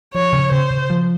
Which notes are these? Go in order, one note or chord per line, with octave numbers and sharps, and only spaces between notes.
F3 C#5
C#3
C#3 C5
C#3
F3